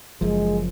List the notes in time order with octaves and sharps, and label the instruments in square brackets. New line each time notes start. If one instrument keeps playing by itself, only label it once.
[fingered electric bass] F#1 F#2 F3 [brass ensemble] G#3